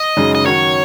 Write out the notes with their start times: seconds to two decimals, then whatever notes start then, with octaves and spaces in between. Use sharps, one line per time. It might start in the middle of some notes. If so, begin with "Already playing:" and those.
Already playing: D#5
0.17 F#2 C#3 G#3 D#4
0.35 D#5
0.45 D#3 F#3 C#4 F#4 C#5